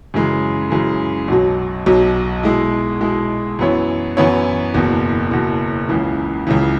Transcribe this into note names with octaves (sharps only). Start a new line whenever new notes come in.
F#2 C#3 E3 G#3
F#2 C#3 E3 G#3
B1 B2 F#3
B1 B2 F#3
B2 G#3 E4
B2 G#3 E4
F#2 E3 B3 E4 C#5
F#2 E3 B3 E4 C#5
F#1 E2 B2
F#1 E2 B2
C#2 C#3 E3
C#2 C#3 E3